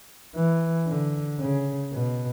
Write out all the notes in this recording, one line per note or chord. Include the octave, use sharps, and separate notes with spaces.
E3
D3
C#3
B2